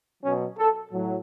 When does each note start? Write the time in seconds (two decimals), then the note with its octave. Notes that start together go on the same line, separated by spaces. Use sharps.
0.22 B2 F#3 C#4
0.57 A4
0.92 A2 F#3